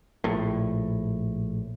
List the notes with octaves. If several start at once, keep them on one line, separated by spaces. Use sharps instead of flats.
A#1 A2